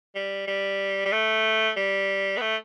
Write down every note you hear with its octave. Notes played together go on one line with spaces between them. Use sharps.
G3
G3
G3
A3
G3
B3
A3